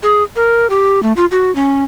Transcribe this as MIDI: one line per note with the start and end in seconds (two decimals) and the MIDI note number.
0.03 0.23 68
0.36 0.67 70
0.70 1.02 67
1.03 1.12 57
1.17 1.25 65
1.31 1.53 66
1.55 1.84 61